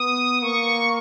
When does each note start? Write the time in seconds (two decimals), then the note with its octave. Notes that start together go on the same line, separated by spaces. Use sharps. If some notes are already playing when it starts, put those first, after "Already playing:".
Already playing: B3 D#6
0.42 A#3 C#6